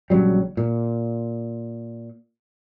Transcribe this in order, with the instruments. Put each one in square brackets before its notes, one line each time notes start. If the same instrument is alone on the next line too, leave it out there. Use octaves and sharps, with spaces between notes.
[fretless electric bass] A#1 C#3 F#3 G3
A#2